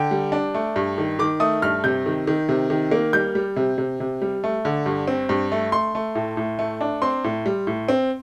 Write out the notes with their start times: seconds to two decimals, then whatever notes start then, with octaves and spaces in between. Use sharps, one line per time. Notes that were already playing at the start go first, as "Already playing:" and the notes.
Already playing: D3 G5
0.11 G3
0.32 D4
0.55 A3
0.76 G2
0.98 D#3
1.19 D#3 D6
1.40 A3 D#6
1.62 G2 F6
1.84 C3 G6
2.06 D#3
2.27 D#3
2.49 C3
2.70 D#3
2.91 A#3
3.13 G3 G6
3.35 G3
3.56 C3
3.78 C3
4.00 C3
4.22 G3
4.44 A3
4.65 D3
4.86 G2
5.08 C4
5.29 G2
5.52 A3
5.72 A3 C6
5.95 A3
6.15 A2
6.37 A2
6.59 A3
6.81 D4
7.02 C4 C6
7.24 A2
7.46 G3
7.67 A2
7.89 C4